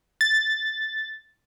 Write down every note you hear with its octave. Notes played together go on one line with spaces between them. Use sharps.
A6